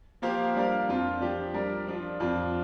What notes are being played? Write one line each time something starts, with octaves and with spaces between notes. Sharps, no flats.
F3 A#3 G4 C5 F5
G3 D4 A#4 F5
F2 F3 C4 F4
F3 D4 G4
G3 D4 A#4 D5
F3 D4 F4
F2 F3 D4 F4